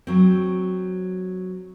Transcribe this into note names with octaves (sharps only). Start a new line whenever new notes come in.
F#3 C4